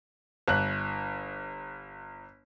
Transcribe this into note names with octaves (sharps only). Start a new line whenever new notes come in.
G1 F#6